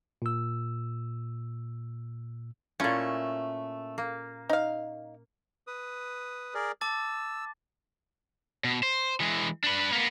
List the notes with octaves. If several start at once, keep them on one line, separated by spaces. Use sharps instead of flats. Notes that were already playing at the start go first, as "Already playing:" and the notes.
A#2 E6
A#2 A3 C#4 E4 F4
A#3
D#4 F5
B4 D#6
G#4 A#4 D5
A5 D6 E6 A6
B2
C5
E3 G#3
D4 B4
A#3 B3